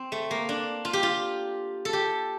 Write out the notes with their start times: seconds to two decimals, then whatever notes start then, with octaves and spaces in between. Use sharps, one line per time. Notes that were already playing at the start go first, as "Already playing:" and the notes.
Already playing: C4
0.12 A3
0.31 A#3
0.49 D4
0.85 F4
0.93 G4
1.03 F4
1.85 A4
1.93 G4